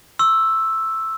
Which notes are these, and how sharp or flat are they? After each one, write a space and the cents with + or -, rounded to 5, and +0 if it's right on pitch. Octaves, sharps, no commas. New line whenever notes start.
C#6 -40 E6 +0